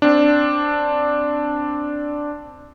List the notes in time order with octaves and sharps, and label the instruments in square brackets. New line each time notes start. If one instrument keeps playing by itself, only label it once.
[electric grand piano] C4 D4